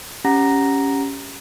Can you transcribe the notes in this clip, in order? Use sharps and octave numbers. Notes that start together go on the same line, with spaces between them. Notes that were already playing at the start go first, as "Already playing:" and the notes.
C#4 G4 F#5 A#5 A#6